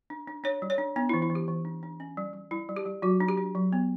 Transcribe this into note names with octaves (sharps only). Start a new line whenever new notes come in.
D4
D4
D4 C#5
G3
C#5
D4
B3 D4
E4
E3
E4
E3
G4
E3
D4
D4
C#4
G3
G3
G3 E4
G3
G4
G3
F#3 F#4
D4
G4
D4
F#3
B3